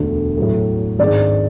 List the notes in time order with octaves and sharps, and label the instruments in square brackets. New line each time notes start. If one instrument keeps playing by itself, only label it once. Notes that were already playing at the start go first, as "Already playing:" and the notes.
Already playing: [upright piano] E1 D2 D3 A3
A2 F#3 A3
[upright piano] G#1 G#2 G#3 D4 [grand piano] D5